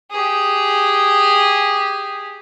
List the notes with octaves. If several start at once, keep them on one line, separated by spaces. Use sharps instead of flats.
G4 G#4